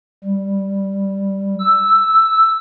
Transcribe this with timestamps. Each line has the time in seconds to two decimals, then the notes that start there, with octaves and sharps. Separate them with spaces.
0.24 G3
1.60 E6